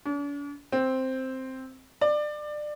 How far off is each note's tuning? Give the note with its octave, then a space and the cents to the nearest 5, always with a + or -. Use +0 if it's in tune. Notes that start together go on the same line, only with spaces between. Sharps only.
D4 -45
C4 +0
D5 +25